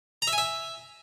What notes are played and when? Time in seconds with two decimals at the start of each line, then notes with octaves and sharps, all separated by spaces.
0.22 A#5
0.27 E5
0.33 G#5
0.38 E5